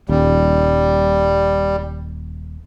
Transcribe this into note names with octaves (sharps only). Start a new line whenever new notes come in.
D#1 G3